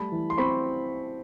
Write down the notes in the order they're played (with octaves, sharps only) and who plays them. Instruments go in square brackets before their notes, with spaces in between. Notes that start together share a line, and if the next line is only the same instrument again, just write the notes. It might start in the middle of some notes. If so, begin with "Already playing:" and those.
Already playing: [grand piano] G3 A3 A5 B5
E3
C6
C4 B5 C#6